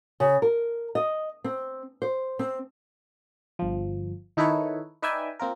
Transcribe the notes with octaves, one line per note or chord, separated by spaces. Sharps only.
C#3
A#4
D#5
C4
C5
C4
G1 F3
D#3 D#4 E4 A4 B4 C#5
D#4 B4 D5 E5 G5 G#5
A#3 C4 F4 A#4